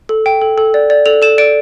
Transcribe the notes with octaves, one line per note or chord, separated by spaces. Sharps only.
A4
G5
A4
A4
D5
D5
A4 F7
A4 E7
D5 D7